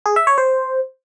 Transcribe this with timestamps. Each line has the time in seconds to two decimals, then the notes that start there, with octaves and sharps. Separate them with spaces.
0.06 G#4
0.16 E5
0.27 C#5
0.38 C5